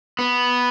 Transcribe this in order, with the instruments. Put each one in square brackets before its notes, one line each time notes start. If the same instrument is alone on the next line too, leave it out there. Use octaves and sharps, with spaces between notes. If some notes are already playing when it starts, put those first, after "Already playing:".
[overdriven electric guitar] B3